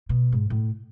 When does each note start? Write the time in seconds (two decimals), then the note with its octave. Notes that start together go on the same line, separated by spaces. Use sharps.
0.09 B2
0.32 G#2
0.50 A2